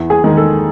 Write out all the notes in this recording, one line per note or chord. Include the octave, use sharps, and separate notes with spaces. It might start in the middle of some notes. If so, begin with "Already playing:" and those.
Already playing: E2 E4
G#4
D#3 G#3
A4